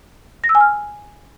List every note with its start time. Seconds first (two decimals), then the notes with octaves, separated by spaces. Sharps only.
0.44 A#6
0.49 E6
0.55 G#5
0.60 F6